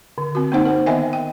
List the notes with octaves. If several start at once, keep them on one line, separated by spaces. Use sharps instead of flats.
D3
C4 F#4
A#3 C4 D#4 C5 F#5
A#4 C5
D#3 B3 D#5 E5 G5 G#5
G5